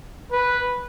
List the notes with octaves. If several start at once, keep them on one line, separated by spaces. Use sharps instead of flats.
B4